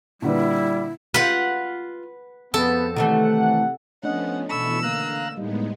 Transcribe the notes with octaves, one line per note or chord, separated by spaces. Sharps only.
A#2 D3 G3 E4 B4
F4 G4 B4 F5 F#5
F2 B3 C4 A4
C3 D#3 E3 A3 F#5
F3 A3 B3 C#4 D4 D#5 F#5
B2 E3 C#4 A4 B5 C#6 E6
D3 A3 A#3 F5 A#5 F#6
A2 G3 G#3 B3 D#4